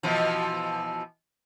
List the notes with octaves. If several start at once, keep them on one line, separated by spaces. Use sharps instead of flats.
B2 E3 F3